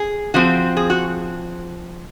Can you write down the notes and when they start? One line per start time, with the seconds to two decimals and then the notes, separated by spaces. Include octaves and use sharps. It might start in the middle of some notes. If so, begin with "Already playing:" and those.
Already playing: G#4
0.34 F3 C4 F#4
0.77 G#4
0.90 F#4